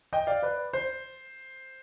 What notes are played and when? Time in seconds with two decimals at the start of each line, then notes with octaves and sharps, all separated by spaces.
0.13 D#5 G5
0.27 D5 F5
0.42 B4 D5
0.73 C5